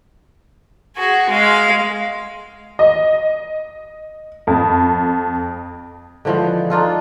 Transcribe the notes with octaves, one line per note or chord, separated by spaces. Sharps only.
F#4 G#4
G#3 F5
D#5
F2
D3 E3 F3 G#3
D4 D#4 F4 A4